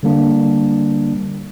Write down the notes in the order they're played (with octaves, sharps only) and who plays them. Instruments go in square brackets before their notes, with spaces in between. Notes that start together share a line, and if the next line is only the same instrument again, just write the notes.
[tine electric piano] D3 G3 A#3 D4